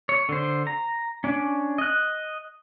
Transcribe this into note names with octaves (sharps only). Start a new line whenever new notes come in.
C#5
D3 C5
A#5
C#4 D4
D#5 F#6